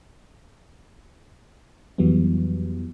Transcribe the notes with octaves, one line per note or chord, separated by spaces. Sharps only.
F2 E3 F#3 G3 B3